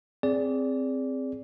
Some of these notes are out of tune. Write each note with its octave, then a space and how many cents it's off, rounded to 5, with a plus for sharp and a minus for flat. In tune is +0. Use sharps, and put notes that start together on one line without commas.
C4 +0 G#4 +0 D5 -20